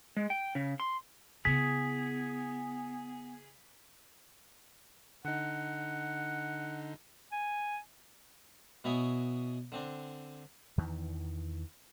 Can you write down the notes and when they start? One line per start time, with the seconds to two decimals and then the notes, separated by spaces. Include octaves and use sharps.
0.17 G#3
0.30 G5
0.55 C#3
0.80 C6
1.45 C#3 B3 E4 G#4 B6
5.25 D3 D#4 F#5
7.32 G#5
8.84 B2 B3 E4 C#5 G#5 D#6
9.72 D3 C4 D4
10.78 E2 D#3 E3